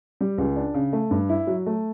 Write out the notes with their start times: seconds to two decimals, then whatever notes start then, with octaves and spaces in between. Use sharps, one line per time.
0.21 G3
0.38 C#2
0.56 D4
0.74 C#3
0.93 A3
1.11 G2
1.29 E4
1.47 F#3
1.66 A3